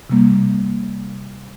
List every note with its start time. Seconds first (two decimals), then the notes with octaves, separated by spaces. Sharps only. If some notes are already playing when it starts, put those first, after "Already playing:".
0.10 C3 G3 A#3